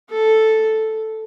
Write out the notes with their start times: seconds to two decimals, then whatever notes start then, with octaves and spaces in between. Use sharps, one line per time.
0.10 A4